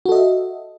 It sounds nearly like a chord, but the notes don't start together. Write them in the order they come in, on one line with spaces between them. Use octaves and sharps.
F#4 A4 D#5 E5